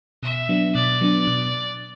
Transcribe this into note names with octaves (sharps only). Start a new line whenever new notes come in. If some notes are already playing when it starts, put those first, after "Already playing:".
B2 E5
F#3 B3 D4
B2 D5
F#3 B3 D4
B2